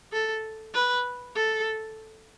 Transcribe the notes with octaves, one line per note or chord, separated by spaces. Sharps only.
A4
B4
A4